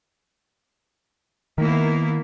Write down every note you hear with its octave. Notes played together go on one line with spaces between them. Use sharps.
D#3 A#3 B3 E4